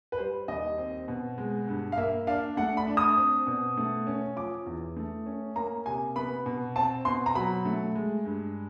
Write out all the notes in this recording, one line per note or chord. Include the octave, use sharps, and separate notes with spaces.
B4
G3 C5
D#2 D#5
C4
B2
G#3
G2
F5
A#3 E5
D4 F5
A3 F#5
B5
D4
D#6
C4
B2
A3
C#4
F3 D6
E2
A3
C#4
A#3 A#5
C3 G#5
B3 B5
B2
C4 A5
B2 C6
A#5
F#3 B5
A3
G#3
G2